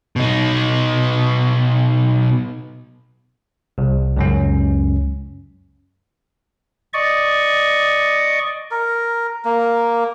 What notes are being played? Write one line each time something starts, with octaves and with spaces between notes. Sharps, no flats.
B2 D#4
C2
C#2 F#2 C#4
D5 D#5 C#6
A#4
A#3